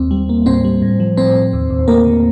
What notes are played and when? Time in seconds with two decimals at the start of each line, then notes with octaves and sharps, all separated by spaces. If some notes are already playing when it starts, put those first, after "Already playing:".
Already playing: D#2 C4
0.11 G3
0.29 A#3
0.46 A2 C4 C5
0.64 G3
0.82 A2
1.00 F3
1.17 A2 C4 C5
1.36 A2
1.53 D#2
1.70 D#2
1.88 A3 A#3 A#4
2.05 D3